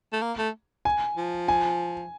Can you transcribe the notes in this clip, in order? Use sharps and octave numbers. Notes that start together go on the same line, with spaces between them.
A3
A#3
A3
G#5
F3
G#5